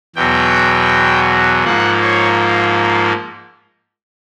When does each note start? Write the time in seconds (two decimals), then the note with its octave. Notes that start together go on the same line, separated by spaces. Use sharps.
0.16 E2 B2 F#3 G5
1.65 G#2 F3 A#3 F#5
2.02 C#5